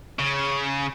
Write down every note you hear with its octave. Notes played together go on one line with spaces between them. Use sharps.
C#3